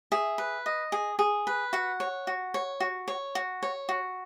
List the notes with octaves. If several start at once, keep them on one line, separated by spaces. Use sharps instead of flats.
G#4 E5
B4
D#5
G#4
G#4
B4
F#4 F#5
C#5
F#4
C#5
F#4
C#5
F#4
C#5
F#4